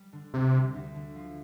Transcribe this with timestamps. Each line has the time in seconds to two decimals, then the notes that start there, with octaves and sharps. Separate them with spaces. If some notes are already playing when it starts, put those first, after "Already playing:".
Already playing: G3
0.13 D3
0.34 D2 C3
0.54 G3
0.74 D2
0.95 D3
1.15 F3